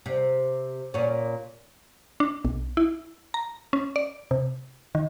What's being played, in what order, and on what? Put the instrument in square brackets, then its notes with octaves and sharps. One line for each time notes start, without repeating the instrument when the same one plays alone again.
[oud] C3
A#2 C#4
[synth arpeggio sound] D4
B1
E4
A#5
C#4
D5
C3
D#3